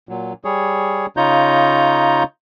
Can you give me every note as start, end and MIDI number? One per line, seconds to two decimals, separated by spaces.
0.09 0.33 46
0.09 0.33 54
0.45 1.06 55
0.45 1.06 68
0.45 1.06 73
1.17 2.23 49
1.17 2.23 63
1.17 2.23 65
1.17 2.23 73
1.17 2.23 82
1.17 2.23 91